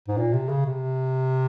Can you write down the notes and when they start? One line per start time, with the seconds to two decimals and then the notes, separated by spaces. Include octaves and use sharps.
0.08 G#2
0.18 A#2
0.33 C3
0.49 C#3
0.66 C3